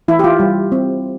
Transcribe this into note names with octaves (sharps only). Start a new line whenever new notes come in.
E3 E4
G4
F4
G3
C4